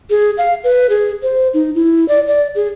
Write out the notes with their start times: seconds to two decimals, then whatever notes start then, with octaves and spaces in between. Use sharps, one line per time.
0.10 G#4
0.38 F5
0.64 B4
0.90 G#4
1.23 C5
1.54 D#4
1.75 E4
2.08 D5
2.27 D5
2.55 G#4